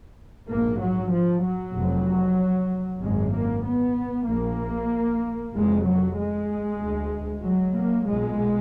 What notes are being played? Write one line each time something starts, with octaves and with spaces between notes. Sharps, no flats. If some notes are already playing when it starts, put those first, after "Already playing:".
A#1 G#2 A#3
F#3
F3
F#3
F1 F2
G#1 F#2 G#3
A#3
B3
A#1 A#2 A#3
F1 F2 G#3
F#3
G#3
D2
F#3
A#3
B1 A#2 G#3